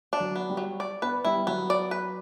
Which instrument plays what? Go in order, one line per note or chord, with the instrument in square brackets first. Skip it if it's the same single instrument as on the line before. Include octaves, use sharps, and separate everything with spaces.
[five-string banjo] D4
[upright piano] F#3
[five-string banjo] B3
[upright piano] G3
[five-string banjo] F#3
D5
[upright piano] B3 [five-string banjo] B4
[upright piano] G3 [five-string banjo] E4
[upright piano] F#3 [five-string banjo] B3
[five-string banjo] D5
B4